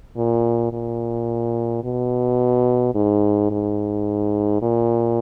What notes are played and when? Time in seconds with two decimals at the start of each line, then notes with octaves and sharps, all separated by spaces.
0.17 A#2
0.72 A#2
1.84 B2
2.95 G#2
3.51 G#2
4.62 A#2